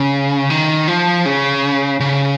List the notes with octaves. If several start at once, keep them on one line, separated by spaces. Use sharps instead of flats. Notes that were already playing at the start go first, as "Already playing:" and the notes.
Already playing: C#3
D#3
F3
C#3
C#3